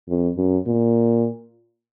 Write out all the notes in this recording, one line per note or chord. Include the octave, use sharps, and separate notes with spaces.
F2
F#2
A#2